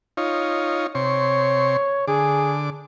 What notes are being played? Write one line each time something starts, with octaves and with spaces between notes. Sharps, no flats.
D#4 F4 C#5
C3 C#5 C6 C#6
D3 G#4 D6